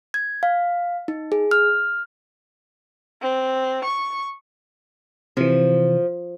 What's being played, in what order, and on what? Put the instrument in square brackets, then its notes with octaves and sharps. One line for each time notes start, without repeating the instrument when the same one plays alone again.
[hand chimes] G#6
F5
D#4
G#4
F6
[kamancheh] C4
C#6
[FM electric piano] C3 E3 [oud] F3